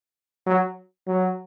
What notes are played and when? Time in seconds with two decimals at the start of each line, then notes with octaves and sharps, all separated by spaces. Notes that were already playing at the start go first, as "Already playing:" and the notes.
0.46 F#3
1.07 F#3